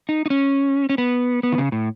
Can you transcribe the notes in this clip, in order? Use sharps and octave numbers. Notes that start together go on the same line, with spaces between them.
D#4
D#4
C#4
C#4
B3
B3
D#3
C#3
A2